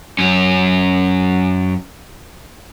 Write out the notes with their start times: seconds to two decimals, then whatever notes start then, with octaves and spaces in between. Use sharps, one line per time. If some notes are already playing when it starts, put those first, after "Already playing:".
0.19 F#2 C#4